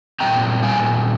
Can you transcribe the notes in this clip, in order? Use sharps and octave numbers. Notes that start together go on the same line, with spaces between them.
A#2 G3 C4 G5 A#5
F5 G#5